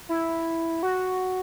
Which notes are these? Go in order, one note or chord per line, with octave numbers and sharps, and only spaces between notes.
E4
F#4